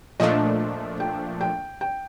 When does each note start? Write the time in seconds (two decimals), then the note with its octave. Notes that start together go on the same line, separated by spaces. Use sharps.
0.20 A#2 F3 A3 D4 D#5
1.00 G5
1.41 G5
1.81 G5